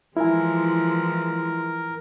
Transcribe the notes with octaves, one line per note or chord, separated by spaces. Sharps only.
E3 F3 G#3 E4 A#4 G#5